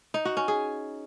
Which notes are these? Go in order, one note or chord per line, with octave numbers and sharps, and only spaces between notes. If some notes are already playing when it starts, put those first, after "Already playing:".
D#4
F#4
C#4
G#4